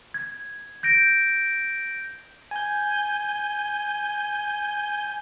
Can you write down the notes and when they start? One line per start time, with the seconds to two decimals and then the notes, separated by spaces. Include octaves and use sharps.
0.14 G#6
0.83 G6 A#6 D7
2.51 G#5 G6